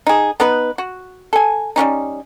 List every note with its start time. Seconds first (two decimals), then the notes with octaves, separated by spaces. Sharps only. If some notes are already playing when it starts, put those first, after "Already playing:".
0.07 D#4 G#4
0.40 B3 D#4 B4
0.78 F#4
1.33 A4 G#5
1.76 G3 B3 C#4 D#4